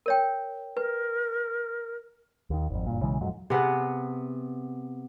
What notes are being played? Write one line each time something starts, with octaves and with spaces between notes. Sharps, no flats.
A#4 C#5 G5
A#4 B4
D#2 D#3
G#1 F2
F#1 G2 A#2
B1 C#3 E3 G#3
D#1 F2 G#2 F#3
C3 B3 G#4 F#5